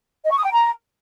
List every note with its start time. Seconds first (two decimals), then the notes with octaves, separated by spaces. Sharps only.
0.24 D#5
0.31 C#6
0.37 D#6
0.44 G5
0.50 A#5